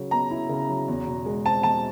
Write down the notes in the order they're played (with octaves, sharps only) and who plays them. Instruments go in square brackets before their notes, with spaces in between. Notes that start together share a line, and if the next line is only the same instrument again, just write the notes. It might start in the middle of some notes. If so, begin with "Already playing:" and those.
Already playing: [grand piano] C#3 F#3
[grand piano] B3 [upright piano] A#5
[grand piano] E4
C#3
F#3
E2
B2
G#3
[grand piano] C4 [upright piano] A5
[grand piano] E2 [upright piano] A5